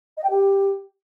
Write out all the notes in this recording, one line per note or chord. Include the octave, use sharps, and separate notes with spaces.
D#5
G5
G4